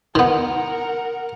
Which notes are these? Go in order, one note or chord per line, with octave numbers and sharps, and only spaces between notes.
D#3 B3 A#4 F#5